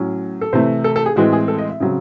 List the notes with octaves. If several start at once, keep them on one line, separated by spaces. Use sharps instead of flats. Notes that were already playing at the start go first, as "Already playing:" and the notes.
Already playing: A2 F#3 C#4
A4
C3 E3 A3 C5
A4
A4
G#4
A2 E3 G#3 C4 F#4
G#4
A4
D#5
E5
C#3 F#3 C4